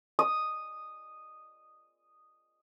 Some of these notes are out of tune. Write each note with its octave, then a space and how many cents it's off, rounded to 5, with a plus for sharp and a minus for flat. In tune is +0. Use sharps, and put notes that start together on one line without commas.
D#6 -5